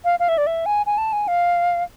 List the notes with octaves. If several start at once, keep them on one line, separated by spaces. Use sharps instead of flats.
F5
F5
E5
D5
E5
G#5
G#5
A5
G#5
F5